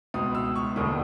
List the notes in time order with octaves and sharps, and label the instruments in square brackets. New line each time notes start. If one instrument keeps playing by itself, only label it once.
[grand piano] C#2 B2 D#6
E6
C#6
E1 D#2 D3 D#6